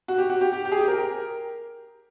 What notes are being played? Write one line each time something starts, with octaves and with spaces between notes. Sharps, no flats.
F#4
G4
F#4
G4
G4
G4
G#4
G4
A#4